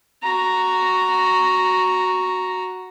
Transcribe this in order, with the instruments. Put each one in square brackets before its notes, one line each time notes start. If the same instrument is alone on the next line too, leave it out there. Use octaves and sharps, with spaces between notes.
[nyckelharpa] F#4 A#5